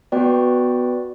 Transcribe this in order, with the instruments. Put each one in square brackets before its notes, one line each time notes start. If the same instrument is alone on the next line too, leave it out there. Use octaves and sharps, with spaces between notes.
[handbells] B3 F#4 B4 D5 G5